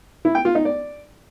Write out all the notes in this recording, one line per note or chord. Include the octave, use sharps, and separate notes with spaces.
E4
G5
F4
D#4
D5